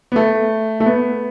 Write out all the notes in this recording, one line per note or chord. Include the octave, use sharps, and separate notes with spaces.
B3
A3
A3
B3